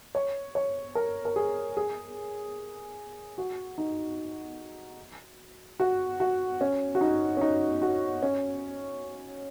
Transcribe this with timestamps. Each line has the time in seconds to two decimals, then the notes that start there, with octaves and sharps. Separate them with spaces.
0.15 C#5
0.55 C#5
0.95 A#4
1.25 A#4
1.36 G#4
1.77 G#4
3.38 F#4
3.78 D#4
5.80 F#4
6.20 F#4
6.61 C#4
6.95 F#4
7.01 D#4
7.37 C#4
7.41 D#4
7.82 F#4
8.22 C#4